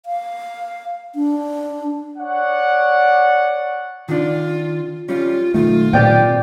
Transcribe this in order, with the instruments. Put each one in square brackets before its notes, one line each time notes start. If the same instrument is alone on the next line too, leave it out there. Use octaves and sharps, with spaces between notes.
[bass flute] F5
D4
[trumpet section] C#5 D5 F#5
[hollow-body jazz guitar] D#3 D4 [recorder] F4
[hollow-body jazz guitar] G3 C#4 [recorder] F4
[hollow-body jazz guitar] B1 F2 D#3 [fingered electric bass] A3 [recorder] F4
[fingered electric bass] A#2 A#3 C4 [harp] G4 D5 G5